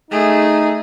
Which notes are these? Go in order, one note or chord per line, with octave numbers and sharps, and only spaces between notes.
A3 D#4 G#4